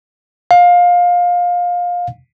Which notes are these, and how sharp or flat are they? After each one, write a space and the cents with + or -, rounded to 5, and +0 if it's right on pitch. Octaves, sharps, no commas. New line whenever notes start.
F5 +20